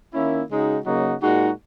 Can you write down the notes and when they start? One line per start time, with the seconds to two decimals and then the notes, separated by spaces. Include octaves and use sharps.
0.14 D#3 A#3 C#4 E4
0.50 C#3 G#3 D#4 F#4
0.85 C#3 F#3 A#3 D#4 F#4
1.22 A#2 G#3 D#4 F#4